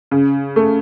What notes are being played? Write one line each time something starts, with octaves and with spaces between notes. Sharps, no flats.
C#3
A3